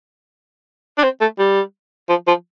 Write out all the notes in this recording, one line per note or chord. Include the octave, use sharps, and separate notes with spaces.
D4
C4
A3
G3
F3
F3